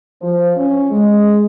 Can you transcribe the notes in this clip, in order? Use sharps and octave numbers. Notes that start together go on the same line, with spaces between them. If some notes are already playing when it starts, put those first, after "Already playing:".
F3
C#4
G#3